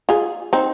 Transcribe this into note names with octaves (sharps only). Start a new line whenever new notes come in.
F4 G#4
C4 D#4